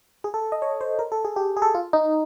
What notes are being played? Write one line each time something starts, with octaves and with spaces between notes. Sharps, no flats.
G#4
A4
D#5
C#5
C5
A#4
A4
G#4
G4
G#4
A4
F4
D#4